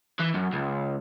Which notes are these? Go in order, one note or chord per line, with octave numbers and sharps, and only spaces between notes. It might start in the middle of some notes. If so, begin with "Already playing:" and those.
E3
F#2
C#2